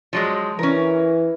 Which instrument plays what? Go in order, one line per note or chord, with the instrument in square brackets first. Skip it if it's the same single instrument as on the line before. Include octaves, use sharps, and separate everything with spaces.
[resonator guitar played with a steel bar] F3 F#3 G#3
[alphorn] E3 [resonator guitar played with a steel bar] C#4 A#4